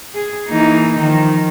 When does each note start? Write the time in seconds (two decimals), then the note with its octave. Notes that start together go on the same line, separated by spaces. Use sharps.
0.15 G#4
0.49 E3 A#3 D#4
0.99 D#3 F3